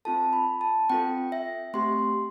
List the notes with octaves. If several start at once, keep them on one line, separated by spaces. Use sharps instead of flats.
C4 F4 A4 A5
B5
A5
C4 F4 A4 G5
E5
A3 C4 G4 C6